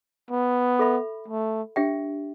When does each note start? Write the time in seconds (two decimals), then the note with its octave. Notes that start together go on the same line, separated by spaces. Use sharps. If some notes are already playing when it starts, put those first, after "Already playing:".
0.30 B3
0.79 A4 E5 B5
1.28 A3
1.76 D4 G4 E5 G5